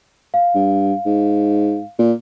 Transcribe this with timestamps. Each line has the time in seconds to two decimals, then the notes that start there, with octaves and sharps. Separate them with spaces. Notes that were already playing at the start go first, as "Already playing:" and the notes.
0.34 F5
0.55 G2
1.06 G#2
1.99 A#2